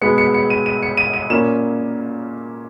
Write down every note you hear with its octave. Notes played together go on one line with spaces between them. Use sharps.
B2 G#3 B3 C#7
C#7
C#7
D#7
D#7
C#7
D#7
D#7
A#2 A#3 C#4 E7